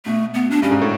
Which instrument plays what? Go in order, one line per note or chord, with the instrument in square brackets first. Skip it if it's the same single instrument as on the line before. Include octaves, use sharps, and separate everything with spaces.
[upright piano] B2 [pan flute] A3
[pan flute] B3
D4
[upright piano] G2 [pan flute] C#4
[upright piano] G#2
A2